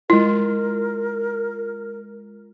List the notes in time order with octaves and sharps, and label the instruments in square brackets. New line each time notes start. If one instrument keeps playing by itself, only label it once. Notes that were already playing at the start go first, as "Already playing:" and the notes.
[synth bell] G#3 F4 [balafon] E4 [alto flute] A#4